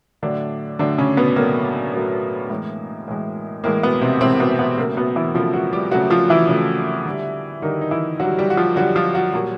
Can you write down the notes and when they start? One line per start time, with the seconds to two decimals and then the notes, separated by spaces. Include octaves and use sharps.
0.22 A2 D3 F#3 A3 D4
0.79 A2 D3 F#3 A3 D4
0.98 C#3 C#4
1.17 B2 B3
1.36 A2 F#3 A3 A#3
1.94 A2 F#3 A3
2.50 A2 E3 G#3
3.08 A2 E3 G#3
3.64 A2 E3 G#3 A#3
3.83 B2 B3
4.01 C3 C4
4.21 A2 C3 E3 G#3 C4
4.40 B2 B3
4.59 B2 B3
4.78 C#3 F#3 A3 A#3
4.97 B2 B3
5.16 E3 E4
5.35 C#3 F3 F#3 A3 F4
5.53 F#3 F#4
5.73 G3 G4
5.91 C#3 F#3 A3 F#4
6.10 F3 F4
6.30 E3 E4
6.48 C#3 F#3 A3
7.06 D3 G3
7.62 D3 D#3 G3 D#4
7.81 D#4
7.91 E3 E4
8.20 D3 F#3 G3 F#4
8.38 G3 G4
8.50 F#4
8.57 F3 F4
8.76 D3 F#3 G3 F#4
8.96 F3 F4
9.15 F#3 F#4
9.33 A#2 F#3 G3 F#4